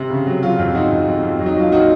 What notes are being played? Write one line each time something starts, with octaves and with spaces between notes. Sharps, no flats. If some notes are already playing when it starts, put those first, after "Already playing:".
Already playing: C3
C#3
F#3
F#3 F4
F2
F2 D#4 F#4
F2
F2
F2
F#3
D#4
F#3 F4
A#2 D#4 F#4